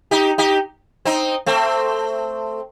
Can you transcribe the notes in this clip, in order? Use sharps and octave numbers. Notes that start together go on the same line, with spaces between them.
D#4 G4
D#4 G4
C4 D#4
A3 C4